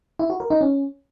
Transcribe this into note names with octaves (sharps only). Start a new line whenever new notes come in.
E4
F#4
A#4
D#4
C#4